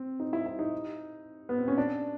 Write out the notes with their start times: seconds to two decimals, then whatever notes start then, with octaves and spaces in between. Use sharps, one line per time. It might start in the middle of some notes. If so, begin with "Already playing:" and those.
Already playing: C4
0.20 D#4
0.33 E4
0.46 E4
0.59 D#4
1.49 B3
1.59 C4
1.68 C#4
1.78 D4